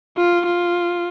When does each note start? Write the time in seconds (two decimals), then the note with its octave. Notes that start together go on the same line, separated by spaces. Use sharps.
0.17 F4
0.46 F4